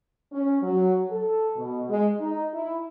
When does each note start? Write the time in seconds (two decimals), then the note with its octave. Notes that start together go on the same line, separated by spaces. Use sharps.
0.32 C#4
0.62 F#3
1.09 A4
1.57 B2
1.89 G#3
2.20 D#4
2.53 E4